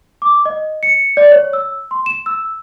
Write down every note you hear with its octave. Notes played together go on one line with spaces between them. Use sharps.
D6
D#5
C#7
D5
C#5
E6
C6
E7
E6